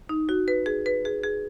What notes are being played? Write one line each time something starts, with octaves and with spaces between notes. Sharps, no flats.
D#4
F#4
B4
G#4
B4
G#4
G#4